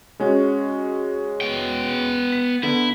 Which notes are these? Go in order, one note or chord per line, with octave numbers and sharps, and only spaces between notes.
G#3 C#4 F#4
B3 G5
B6
D3 B3 E4